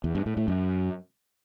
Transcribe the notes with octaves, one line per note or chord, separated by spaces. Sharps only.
E2
G2
A2
A2
F#2